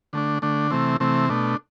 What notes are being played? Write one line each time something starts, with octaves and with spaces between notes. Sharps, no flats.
D3 A3 D4
D3 A3 D4
C3 E3 A3 C4
C3 E3 A3 C4
B2 A3 D4